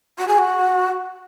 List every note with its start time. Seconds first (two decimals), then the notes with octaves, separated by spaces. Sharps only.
0.18 F#4
0.27 G#4
0.38 F#4